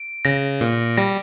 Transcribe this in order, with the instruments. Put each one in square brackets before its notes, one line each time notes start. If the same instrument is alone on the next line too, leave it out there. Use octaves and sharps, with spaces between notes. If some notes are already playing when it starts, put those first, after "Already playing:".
Already playing: [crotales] D7
[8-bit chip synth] C#3 [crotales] A#6
[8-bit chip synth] A#2
[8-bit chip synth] G3 [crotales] A#6